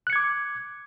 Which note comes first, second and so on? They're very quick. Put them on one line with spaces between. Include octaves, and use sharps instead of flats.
F#6 C#7 G#6 D6